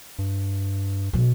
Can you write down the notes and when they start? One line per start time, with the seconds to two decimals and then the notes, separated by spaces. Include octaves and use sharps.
0.19 G2
1.13 B2 F#3